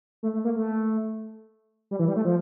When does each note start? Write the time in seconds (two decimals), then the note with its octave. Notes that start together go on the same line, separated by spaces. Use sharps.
0.23 A3
0.34 A3
0.45 A#3
0.56 A3
1.91 G3
1.99 E3
2.08 G3
2.16 A3
2.25 F3